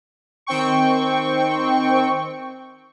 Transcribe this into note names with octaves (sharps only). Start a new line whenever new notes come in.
D#3 C4 G5 C#6